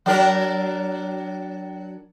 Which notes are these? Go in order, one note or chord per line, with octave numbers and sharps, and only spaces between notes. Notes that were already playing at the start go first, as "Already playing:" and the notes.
F#3 D4 A#4